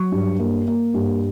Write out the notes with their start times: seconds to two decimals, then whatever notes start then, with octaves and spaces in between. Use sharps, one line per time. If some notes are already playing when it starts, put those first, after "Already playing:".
Already playing: F#3 C#6
0.12 G2
0.39 A#3
0.68 A#3
0.94 G2